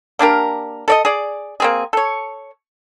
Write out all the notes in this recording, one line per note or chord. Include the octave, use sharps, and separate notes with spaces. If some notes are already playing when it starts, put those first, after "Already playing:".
A#3 D4 G4 A#4
A4 D5 D#5
G#4 D5
A#3 C4 G#4
A4 C#5